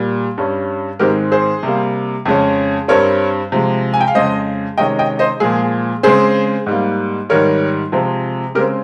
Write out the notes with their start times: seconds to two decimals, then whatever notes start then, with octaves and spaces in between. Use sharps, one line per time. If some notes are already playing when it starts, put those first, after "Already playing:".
Already playing: A#2 G3
0.38 G2 G3 C#4
0.99 G#2 D#3 G#3 C4 G4 A#4
1.32 G#4 C5
1.63 C3 G3 A#3
2.25 F2 C#3 G#3 C#4
2.88 G2 G3 C4 A#4 C#5
3.52 C3 F3 G#3
3.94 G#5
4.01 G5
4.08 F5
4.15 F2 C#3 G#3 C5 D#5
4.78 C3 D#3 G#3 C#4 D#5 G5
4.99 D#5 G5
5.19 C5 D#5
5.40 A#2 F3 G#3 G#4
6.03 C#3 G#3 C4 G#4 C5
6.66 G#2 G3 A#3
7.29 G#2 D#3 G3 A#4 C#5
7.92 C3 F3 G#3 C4
8.55 C#3 G#3 C4 G4 A#4